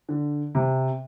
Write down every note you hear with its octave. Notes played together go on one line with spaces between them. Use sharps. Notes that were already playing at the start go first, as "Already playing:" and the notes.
D3
C3